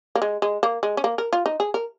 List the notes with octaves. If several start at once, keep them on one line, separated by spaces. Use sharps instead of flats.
A#3
G#3
G#3
A#3
G#3
C#4
A#3
A#4
F4
D#4
G#4
A#4